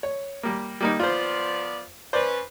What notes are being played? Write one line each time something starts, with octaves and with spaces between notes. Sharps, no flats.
C#5
G3 A#3
G3 A#3 D#4
F3 B3 F4 C5 D5
C#4 B4 C5 D5